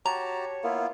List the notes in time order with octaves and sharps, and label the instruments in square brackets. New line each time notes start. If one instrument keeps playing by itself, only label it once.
[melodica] F#4 G4 A5 [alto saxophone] C#5 [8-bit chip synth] A#5
[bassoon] A#3 [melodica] B3 E4 F4